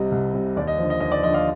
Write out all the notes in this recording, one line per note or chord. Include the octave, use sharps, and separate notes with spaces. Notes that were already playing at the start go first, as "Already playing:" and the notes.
Already playing: C2 C3 G3 D#5
C2
C3 G3
D#2 D5
D#5
D3 F3
D#5
D#2 D#5
D5
D3 F3 D#5
D5 F5